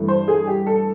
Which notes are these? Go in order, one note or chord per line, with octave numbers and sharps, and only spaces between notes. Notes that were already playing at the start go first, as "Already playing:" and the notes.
Already playing: G2 E3 A3
C5
G#4
G4
A4